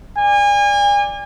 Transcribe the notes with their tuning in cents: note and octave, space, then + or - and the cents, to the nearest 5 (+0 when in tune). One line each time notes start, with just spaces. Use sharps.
D5 +0 G#5 -35